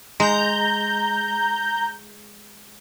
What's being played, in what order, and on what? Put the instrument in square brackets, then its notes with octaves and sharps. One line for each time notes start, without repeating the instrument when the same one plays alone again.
[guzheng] G#3 [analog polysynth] A#5 G6